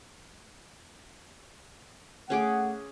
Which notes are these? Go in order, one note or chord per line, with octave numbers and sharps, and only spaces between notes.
A3 C#4 G#4 F#5 D6